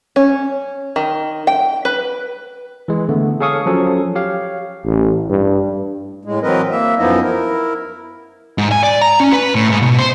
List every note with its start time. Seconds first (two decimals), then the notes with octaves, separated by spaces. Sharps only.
0.16 C#4
0.96 D#3
1.47 G5
1.85 B4
2.88 E3 G#3
3.09 D3 A3 B3
3.40 G#4 A4 C#5 F5 C#6 D#6
3.66 F3 F#3 C#4 A4
4.15 G4 C#5 F5
4.85 A1
5.30 G2
6.25 A2 G#3
6.43 E3 F#3 C4 A#4 B4 D#5
6.71 A#3 E5
6.99 F#2 F3 B3 D#4 E4 D#5
7.22 E4 A#4
8.58 G#2
8.72 G#5
8.83 D5
9.02 A#5
9.20 C#4
9.33 B4
9.55 A2
9.69 G#2
9.82 B2
9.99 C5